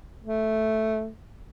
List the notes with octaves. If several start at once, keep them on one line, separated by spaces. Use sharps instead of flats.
A3